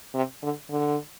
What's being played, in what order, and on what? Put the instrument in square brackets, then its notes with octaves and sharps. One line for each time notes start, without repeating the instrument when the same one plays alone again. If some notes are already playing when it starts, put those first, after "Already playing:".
[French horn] C3
D3
D3